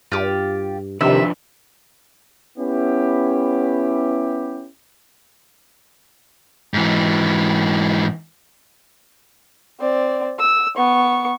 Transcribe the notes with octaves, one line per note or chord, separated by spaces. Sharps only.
G2 F4 G4
C3 D#3 F3 D4 B4 E5
B3 C#4 E4 G4
G#2 E3
C4 D5
E6
B3 C#6